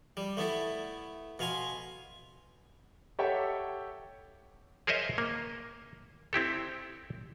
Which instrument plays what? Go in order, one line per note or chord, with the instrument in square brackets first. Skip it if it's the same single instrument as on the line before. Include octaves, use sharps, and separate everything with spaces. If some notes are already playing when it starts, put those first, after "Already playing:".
[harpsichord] G3
A3 B3 E4 A4
B2 F5 G#5 C6
[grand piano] G4 A4 C#5 E5 F#5 G5
[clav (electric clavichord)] G#4 A#4 C5 C#5 D#5 E5
A#3
C4 E4 G4 A4